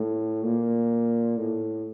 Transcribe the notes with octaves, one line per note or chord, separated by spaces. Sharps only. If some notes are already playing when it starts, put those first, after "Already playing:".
Already playing: A2
A#2
A2